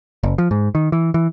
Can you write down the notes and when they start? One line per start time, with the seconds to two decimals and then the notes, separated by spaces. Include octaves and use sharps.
0.23 F#1
0.38 F3
0.51 G#2
0.75 D#3
0.92 E3
1.14 E3